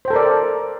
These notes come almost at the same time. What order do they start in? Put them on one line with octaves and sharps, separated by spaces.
C5 G5 A4 A#4 D5